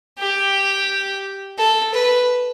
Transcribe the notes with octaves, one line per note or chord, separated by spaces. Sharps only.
G4
A4
B4